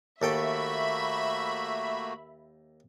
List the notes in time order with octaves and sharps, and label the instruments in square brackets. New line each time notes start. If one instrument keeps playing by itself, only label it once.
[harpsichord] D#2 A4 G5 [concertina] A3 A#3 F#4 [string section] E5 B5